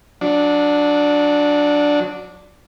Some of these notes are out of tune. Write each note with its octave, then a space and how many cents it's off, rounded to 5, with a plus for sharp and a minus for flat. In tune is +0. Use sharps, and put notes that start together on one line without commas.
F#3 -25 D4 +0